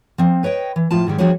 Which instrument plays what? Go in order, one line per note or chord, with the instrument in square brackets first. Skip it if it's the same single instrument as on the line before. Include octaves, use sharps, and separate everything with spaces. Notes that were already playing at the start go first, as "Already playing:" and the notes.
[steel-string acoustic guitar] F3 C4
B4 C#5 D#5 G5
E3
A2 F3 F4 A5
G#2 D#3 G3 G#3
F3 G3 D4 F#4 G#4 C#5